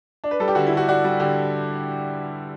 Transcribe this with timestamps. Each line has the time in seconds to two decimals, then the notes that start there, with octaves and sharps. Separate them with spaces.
0.24 D4
0.31 B4
0.40 G3 A4
0.48 G4
0.55 D3 F#4
0.67 E4
0.72 D3
0.77 F#4
0.88 D4 F#4
1.04 G3
1.20 D3 G4